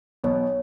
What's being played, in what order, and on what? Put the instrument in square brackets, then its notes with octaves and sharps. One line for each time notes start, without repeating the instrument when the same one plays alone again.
[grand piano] B1 B2 B3 [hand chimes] C#5